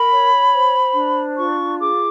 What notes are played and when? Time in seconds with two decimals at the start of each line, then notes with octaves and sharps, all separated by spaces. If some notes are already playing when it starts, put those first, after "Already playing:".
Already playing: A#4 B5
0.11 C#5
0.53 C5
0.94 D4
1.37 F4 C#6
1.78 G#4 D6